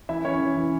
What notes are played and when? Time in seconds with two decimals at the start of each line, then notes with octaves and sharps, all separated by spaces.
0.09 E3 E4 E5
0.25 E3 C#4 C#5
0.41 E3
0.57 E3